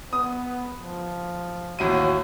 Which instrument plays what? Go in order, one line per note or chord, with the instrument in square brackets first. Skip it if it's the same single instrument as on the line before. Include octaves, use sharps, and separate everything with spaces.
[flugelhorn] B3 [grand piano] D#6
[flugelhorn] F3
[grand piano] A1 D#2 D#7 [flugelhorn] F#4